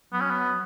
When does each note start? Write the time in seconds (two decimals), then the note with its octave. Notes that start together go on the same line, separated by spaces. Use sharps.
0.12 F#3 B3
0.21 C#4
0.30 B3